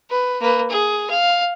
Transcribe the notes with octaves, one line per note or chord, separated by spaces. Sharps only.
B4
A#3 B4
G#4
F5